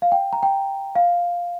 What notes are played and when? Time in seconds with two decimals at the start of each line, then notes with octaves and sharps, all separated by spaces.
0.02 F5
0.12 G5
0.33 A#5
0.43 G5
0.96 F5